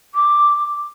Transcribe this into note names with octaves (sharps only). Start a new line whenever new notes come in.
D6